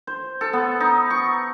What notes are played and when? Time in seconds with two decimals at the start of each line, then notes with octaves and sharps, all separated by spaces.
0.07 C5
0.41 A4
0.53 B3
0.80 D#4
1.10 C#6